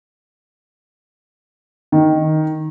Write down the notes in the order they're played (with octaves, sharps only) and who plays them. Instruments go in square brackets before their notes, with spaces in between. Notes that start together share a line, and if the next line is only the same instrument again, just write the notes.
[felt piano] D#3